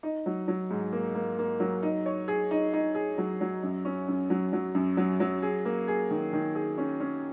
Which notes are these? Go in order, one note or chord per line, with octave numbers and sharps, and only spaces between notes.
D#4
F#3
F#3
G#2
A#3
A#3
A#3
F#3
D#4
C#5
G#4
D#4
D#4
G#4
F#3
F#3
F#2
C#4
F#2
F#3
F#3
F#2
F#3
F#3
G#4
A#3
G#4
D#3
D#3
G#4
C#4
C#4